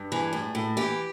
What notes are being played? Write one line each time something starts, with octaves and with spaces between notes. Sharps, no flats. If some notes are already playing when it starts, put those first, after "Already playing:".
Already playing: G2
E3 G#4
A2
A2
E3 G4